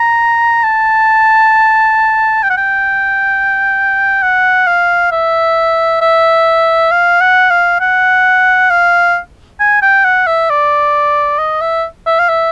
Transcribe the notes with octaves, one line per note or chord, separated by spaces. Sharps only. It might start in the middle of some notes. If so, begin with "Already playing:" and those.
Already playing: A#5
A5
G5
F#5
G5
F#5
F5
E5
E5
F5
F#5
F5
F#5
F5
G#5
G5
F#5
E5
D5
D#5
E5
E5
F5
E5